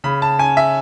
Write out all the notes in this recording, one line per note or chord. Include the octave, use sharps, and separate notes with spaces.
C#3 B5
A5
C#4 G#5
E5